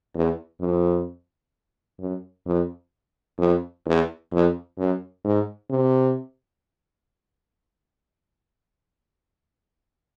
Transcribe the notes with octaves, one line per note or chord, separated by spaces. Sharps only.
E2
F2
F#2
F2
F2
E2
F2
F#2
G#2
C3